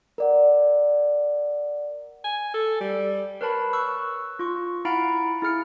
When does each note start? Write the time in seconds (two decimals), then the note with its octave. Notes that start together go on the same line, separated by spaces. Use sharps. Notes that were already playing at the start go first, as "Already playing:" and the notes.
0.18 A#4 D5 F#5
2.24 G#5
2.54 A4
2.80 G3
3.41 A#4 B4 C#5 A5 B5
3.73 C#6 E6 F#6
4.39 F4 C#6
4.85 E4 F5 F#5 A#5 B5 D7
5.42 E4 G#4 F6 C#7